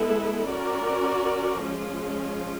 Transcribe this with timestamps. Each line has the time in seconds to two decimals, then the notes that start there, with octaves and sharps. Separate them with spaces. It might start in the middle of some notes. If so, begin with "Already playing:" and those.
Already playing: G#3 B3 E4 A4
0.49 C#4 F#4 A#4 D5
1.66 F3 G#3 C#4 F4